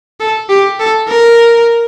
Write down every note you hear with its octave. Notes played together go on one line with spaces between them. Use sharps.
A4
G4
A4
A#4